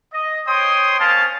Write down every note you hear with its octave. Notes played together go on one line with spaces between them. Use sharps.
D#5
C5 C#5 G5 C6 D#6
A#3 C4 C#4 F5 A5